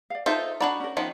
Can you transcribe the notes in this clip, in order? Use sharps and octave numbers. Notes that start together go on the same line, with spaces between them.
D5 F5
D#4 F4 A4 C5 E5 A5
D4 F#4 D5 F#5 A#5 B5
C#4 A#4
D#3 F3 B3